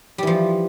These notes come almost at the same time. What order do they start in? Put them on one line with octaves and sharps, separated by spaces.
G3 E3 F3